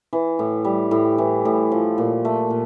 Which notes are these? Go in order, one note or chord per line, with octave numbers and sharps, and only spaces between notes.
E3
A2
G3
A2
E3
A2
F3
A#2
A3
A#2